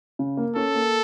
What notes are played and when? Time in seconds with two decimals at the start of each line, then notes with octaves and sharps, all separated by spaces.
0.19 C#3
0.37 A#3
0.56 C#4 A4
0.75 A#3